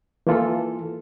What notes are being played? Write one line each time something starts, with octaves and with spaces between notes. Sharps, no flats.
E3 A#3 F4 A4